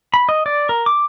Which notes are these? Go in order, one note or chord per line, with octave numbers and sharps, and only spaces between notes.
B5
D#5
D5
A#4
D6